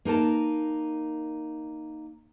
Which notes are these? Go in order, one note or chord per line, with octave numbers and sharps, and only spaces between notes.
A#3 D#4 A#4 A5